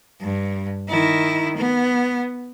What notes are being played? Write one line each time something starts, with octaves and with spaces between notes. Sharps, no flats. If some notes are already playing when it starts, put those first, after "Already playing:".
G2
D#3 E4
B3